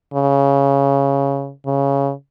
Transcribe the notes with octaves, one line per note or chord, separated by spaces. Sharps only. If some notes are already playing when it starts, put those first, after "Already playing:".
C#3
C#3